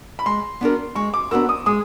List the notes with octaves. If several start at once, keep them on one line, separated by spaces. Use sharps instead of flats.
B5
G#3 C6
B3 D4 F#4 A#4
G#3 C#6
D6
B3 D4 F#4 A#4 E6
D#6
G#3 D#6